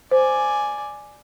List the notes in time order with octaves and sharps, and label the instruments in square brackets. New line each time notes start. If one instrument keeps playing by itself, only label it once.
[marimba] C5 [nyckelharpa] D5 G#5